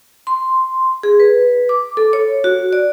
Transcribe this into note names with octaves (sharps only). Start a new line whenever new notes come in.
C6
G#4
B4
D6
A4
C#5
F#4
D5